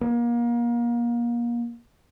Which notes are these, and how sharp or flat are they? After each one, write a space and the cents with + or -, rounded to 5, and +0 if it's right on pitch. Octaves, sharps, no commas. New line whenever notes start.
A#3 +30